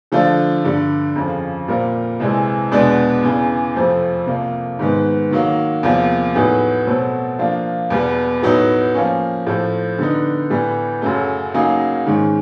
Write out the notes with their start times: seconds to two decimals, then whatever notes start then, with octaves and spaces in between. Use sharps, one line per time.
0.12 D3 F3 A3 D4 F4
0.64 G2 D3 G3
1.16 F2 C#3 F3
1.68 A#2 G3 C4 F4 A#4
2.20 C2 C3 E3 G#3
2.72 E2 B2 G#3 B3 D4
3.23 E2 C#3 E3
3.76 F2 C3 F3 A3 C4
4.27 C2 C3 F3 A#3
4.79 G#2 D#3 G#3 B3
5.31 D#3 F#3 A#3
5.83 E2 C3 F3 A#3
6.35 A2 F#3 B3 D#4 G#4
6.87 B2 F#3 A3 C4
7.39 F3 A#3 D4 F4
7.90 E2 B2 G3 B3
8.43 A2 F#3 B3 D#4
8.94 F3 A#3 C#4
9.47 A2 F3 A3 C4
9.99 D3 G3 B3 D#4
10.50 A2 E3 G3 B3
11.02 F#2 C#3 F#3 A3
11.54 C#3 F#3 A#3 D#4 G#4
12.06 G#2 D#3 G#3 C#4